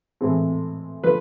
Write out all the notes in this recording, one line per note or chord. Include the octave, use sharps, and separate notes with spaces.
A2 E3 G#3 C4
D3 F3 B4